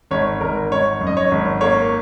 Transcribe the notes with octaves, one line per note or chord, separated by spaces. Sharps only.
G#1 C#5
G#1 A#4
G#1 C#5
F#2
D#5
C#5
G#1
A#3 C#5